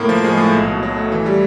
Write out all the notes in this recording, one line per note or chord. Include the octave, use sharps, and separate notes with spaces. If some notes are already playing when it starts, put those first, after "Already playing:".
Already playing: A2 A#3
F3
G#3
A2
B1
B2
F#3
A3
E3
G3